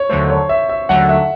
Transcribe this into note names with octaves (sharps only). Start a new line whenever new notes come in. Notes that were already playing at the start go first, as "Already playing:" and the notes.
Already playing: C#5
D#2 D3 F#3 A3 C5
C#5
E5
E5
D#2 D3 F#3 A3 F#5
E5